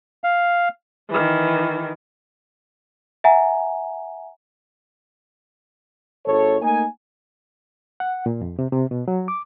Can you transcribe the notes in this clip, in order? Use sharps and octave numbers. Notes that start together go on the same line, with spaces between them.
F5
D#3 E3
E5 F#5 G#5 A#5
G#1 A4 C#5
A3 A#3 D#4 G#5
F#5
A#2
F2
C3
C3
B2
F#3
D6